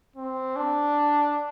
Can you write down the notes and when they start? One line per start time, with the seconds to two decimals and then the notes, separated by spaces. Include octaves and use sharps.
0.16 C4
0.56 D4